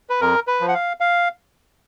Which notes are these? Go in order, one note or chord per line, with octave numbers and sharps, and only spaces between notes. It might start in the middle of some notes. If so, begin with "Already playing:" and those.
B4
F2 A#4
B4
F3
F#5
F5
F5